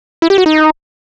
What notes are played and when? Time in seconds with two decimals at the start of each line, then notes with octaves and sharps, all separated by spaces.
0.22 E4
0.30 G4
0.38 F#4
0.46 D#4